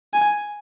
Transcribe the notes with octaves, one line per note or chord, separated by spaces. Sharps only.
G#5